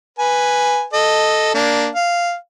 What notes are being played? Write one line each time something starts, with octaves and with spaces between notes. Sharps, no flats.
B4 G#5
A4 D#5
A#3 D4
F5